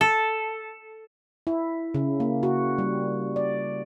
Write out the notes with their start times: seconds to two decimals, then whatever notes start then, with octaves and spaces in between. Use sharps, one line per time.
0.01 A4
1.47 E4
1.94 C#3
2.20 A#3
2.43 F#4
2.78 G3
3.36 D5